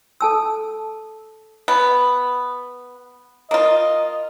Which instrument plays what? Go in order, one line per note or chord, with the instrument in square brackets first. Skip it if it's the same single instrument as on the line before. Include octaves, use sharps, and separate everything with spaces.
[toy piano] A4 A5 E6
[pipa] B3
[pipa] A#3 F4 [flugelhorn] D#5